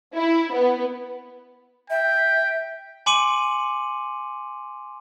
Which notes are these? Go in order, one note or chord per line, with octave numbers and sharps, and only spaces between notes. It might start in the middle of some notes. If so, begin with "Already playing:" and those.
E4
B3
E5 G5
G#5 C6 D6 C#7 D#7 F#7